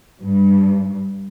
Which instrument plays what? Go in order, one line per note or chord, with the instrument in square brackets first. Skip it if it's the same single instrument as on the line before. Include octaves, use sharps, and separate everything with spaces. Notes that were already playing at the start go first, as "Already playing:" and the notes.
[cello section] G2